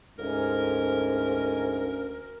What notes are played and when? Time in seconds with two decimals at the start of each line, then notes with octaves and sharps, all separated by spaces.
0.19 D2 G#2 C#4 A#4